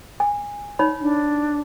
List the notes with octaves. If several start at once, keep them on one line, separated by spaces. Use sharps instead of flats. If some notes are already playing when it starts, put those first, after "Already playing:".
G#5
D#4 C#5 B5
D4